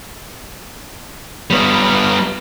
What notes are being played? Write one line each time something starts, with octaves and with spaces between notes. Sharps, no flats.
G3 B3